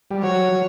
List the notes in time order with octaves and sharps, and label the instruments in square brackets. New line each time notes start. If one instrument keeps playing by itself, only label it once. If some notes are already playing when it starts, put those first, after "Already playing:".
[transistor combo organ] G3
[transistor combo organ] F#3 [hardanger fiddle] C#5
[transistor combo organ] F#3